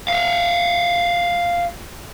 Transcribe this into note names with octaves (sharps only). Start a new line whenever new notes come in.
E5 F5